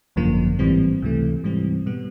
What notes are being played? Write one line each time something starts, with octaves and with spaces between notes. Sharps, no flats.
G#1 F#2 D3 F3 A#3
A1 G#2 E3 G3 C4
C#2 C3 E3 A3
G#2 E3 G3 C4
B2 G3 B3